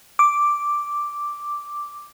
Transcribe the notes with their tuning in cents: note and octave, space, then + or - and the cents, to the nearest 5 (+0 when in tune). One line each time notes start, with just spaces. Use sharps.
D6 +0